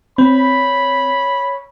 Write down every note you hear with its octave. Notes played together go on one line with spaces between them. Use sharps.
C4 C#5 B5